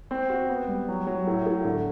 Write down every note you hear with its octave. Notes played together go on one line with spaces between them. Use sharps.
C4
F#4
B3
G3
F#3
F#3
A2
A2
D3